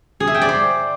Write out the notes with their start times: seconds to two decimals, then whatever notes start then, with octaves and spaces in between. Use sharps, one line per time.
0.20 G#4
0.27 E5
0.34 G5
0.42 D5
0.49 C5